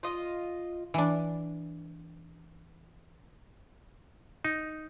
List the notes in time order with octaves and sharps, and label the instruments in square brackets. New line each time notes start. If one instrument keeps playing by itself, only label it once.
[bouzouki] F4 D#5
[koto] E3 D4
[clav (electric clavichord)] D#4